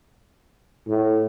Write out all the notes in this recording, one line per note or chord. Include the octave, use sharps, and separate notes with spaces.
A2